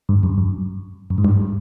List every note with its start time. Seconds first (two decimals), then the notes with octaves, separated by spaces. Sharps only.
0.09 G2
0.23 F#2
0.38 F#2
1.10 F#2
1.18 G#2
1.25 G2